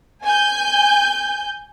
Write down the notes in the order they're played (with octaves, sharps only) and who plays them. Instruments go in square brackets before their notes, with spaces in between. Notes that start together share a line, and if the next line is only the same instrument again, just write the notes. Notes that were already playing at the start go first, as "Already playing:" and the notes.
[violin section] G#5 G6